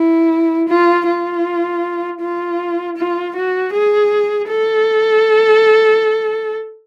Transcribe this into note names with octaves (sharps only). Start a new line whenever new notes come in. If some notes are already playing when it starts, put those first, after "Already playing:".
Already playing: E4
F4
F4
F4
F4
F#4
G#4
A4